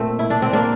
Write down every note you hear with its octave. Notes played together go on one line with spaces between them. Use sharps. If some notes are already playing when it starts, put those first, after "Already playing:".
Already playing: A#2 A3 C4
E4
D4
C4
A#3 D4